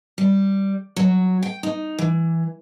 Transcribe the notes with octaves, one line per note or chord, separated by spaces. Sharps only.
G3
F#3
G5
D#4
E3